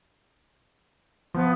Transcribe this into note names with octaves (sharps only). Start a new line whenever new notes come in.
F3 B3